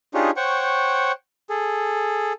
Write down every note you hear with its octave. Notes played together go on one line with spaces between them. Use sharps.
D4 D#4 F4 G4 G#4 C#5
C5 C#5 F#5 G5 C#6
G#4 A4